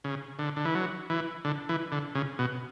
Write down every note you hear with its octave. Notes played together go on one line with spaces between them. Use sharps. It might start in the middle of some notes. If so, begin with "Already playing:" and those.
C#3
D3
D3
E3
F#3
E3
D3
E3
D3
C#3
B2